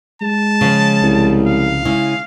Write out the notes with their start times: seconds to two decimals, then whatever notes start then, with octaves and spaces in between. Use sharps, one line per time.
0.22 G#3 A5
0.61 C#3 F3
1.02 C2
1.46 F5
1.85 C#3 G#3 E4